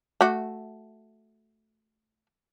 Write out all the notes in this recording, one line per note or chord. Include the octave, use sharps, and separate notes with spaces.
A3 F#4